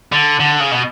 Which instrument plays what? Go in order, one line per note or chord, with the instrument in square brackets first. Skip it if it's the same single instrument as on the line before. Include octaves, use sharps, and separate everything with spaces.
[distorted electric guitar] D3
D3
C#3
B2